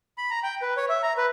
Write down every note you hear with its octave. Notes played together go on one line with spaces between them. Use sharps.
B5
A#5
G5
B4
C#5
E5
A#5
B4